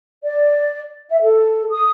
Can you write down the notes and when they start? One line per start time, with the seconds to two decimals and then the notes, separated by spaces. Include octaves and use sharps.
0.24 D5
1.10 E5
1.22 A4
1.71 D#6